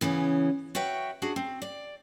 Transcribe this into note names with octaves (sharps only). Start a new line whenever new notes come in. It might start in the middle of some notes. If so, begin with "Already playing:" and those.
C#3 E3 B3 C#4
F#4 B4 C#5 E5 G5
D4 F#4 G#4
C4
D5